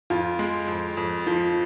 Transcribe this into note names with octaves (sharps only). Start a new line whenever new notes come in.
F2 F4
G#3
F2
F2
F3